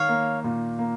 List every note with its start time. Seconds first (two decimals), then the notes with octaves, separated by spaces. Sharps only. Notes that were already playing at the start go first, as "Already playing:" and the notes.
Already playing: D#3 C#5 F5
0.09 A#3
0.44 A#2
0.79 A#3